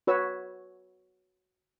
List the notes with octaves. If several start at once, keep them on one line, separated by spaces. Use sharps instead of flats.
F#4 B4 C#5 E6